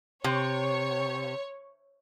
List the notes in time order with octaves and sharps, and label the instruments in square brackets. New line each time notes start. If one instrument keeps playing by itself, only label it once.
[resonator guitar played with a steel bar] C3 [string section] C#5